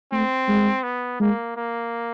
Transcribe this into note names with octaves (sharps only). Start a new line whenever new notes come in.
A3 C4
G#3
B3
G#3 A#3
A#3